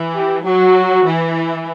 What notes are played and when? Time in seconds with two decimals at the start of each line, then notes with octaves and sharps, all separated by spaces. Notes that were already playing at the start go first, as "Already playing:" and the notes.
Already playing: E3
0.16 G4
0.45 F#3 F#4
1.05 E3